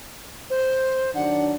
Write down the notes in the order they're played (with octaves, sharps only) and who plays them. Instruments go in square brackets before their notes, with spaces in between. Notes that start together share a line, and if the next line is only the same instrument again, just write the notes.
[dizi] C5
[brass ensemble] D#3 F#3 D4 [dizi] F#5